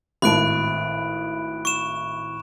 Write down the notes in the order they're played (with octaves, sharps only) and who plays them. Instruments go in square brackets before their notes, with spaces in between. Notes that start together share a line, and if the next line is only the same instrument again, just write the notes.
[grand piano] G#1 A2 A5 [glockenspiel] B5 F#6 D7
[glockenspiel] C#6 E7